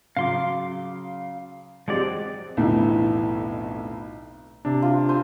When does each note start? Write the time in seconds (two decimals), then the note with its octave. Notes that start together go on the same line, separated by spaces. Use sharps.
0.17 C#3 F#3 F5 C6 D6
1.88 F3 F#3 G#3 C4 G4 D5
2.57 B1 F2 A2 D3 E3
4.65 C3 D4
4.82 F4
5.09 C5 G#5